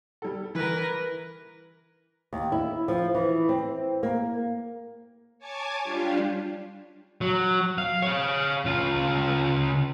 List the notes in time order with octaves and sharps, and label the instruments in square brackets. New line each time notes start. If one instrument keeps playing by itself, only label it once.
[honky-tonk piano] G3 A4
[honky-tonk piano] E3 [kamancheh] A#4 B4
[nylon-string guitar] D#2
E4
F3
E3
C4
A#3
[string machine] C#5 G#5 A5 D6 G#6
G3 D4 F4 G4
[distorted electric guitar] F#3
F5
C#5 F5
C#3 F4